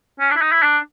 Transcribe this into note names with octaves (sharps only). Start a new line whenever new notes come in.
C#4
D4
E4
D#4
E4
D4